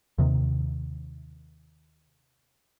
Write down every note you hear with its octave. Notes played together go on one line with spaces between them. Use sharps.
D#2 C3 D#3